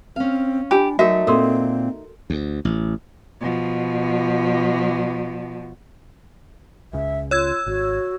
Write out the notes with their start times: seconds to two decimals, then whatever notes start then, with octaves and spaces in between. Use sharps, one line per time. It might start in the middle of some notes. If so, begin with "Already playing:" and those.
0.16 C4 C#4 F5
0.71 D4 F4 G4 G#5
0.99 F#3 A3 D#4 F#4 A#4 E5
1.27 A#2 C4 A4 A#4 C6
2.30 D2
2.65 A1
3.41 B2 F3
6.93 C#2 C#3 E5
7.31 F4 C#5 E6 G#6
7.66 G#1 F#4